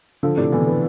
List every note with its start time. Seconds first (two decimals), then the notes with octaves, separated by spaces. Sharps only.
0.23 D3 F3 A4
0.37 A2 C3 D4
0.52 B2 D3 E3
0.67 B3